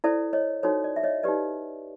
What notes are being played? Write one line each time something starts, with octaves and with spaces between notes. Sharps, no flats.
E4 A4 C5 D5
C#5 D#5
D#4 F#4 A4 C5 C#5
D5
E5
C#5 D#5
D#4 G4 B4 D5